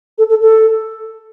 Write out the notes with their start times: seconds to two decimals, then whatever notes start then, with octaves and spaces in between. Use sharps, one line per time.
0.18 A4
0.30 A4
0.41 A4